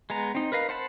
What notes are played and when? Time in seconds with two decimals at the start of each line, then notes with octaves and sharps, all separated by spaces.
0.10 G#3 B3 A#5
0.35 C4 D#4
0.52 A#4 B4 D#5 F5
0.69 C5 F#5 A5 B5